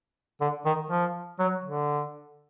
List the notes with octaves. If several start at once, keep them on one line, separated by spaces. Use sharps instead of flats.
D3
D#3
F3
F#3
D3